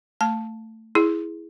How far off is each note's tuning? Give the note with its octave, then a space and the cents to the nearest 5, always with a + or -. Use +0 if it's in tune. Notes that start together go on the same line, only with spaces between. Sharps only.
A3 +20 A5 +0
E4 +0 G#4 +0